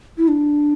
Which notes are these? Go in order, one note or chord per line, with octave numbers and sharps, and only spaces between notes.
E4
D4